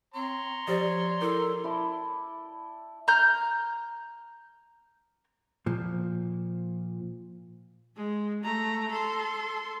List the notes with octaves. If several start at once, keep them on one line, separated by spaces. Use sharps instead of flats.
C4 C#5 A#5 C6
F3 G4 C5 D5
E4 A4 A#4
E4 D5 A5
A#5 F6 G6
A#2 F3
G#3
A3 A#5
A4 C6